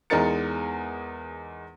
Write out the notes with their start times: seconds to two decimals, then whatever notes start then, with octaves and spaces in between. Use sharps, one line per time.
0.10 E2 G#3 D#4 A#4 A6 C#7